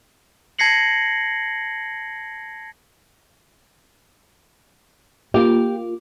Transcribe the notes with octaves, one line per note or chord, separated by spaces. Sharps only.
A5 G#6 A#6 C7 C#7 F#7
A#3 F4 G4